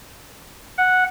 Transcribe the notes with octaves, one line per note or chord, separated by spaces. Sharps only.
F#5